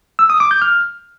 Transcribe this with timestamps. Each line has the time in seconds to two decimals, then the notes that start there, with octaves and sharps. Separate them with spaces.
0.19 E6
0.30 D#6
0.40 D6
0.51 G6
0.62 F6